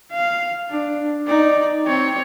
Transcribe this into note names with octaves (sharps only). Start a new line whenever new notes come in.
F5
D4
D#4 D5
C4 C#5